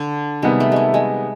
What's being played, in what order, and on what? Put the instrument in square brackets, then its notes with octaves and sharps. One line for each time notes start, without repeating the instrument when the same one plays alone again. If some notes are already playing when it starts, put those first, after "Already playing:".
Already playing: [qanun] D3
[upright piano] C3 D#3 G3 B3 [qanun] G#3
[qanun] A3
G#3 A3
G#3